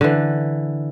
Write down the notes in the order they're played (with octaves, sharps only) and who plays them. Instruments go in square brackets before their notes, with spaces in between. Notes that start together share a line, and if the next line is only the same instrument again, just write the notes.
[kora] D3 E3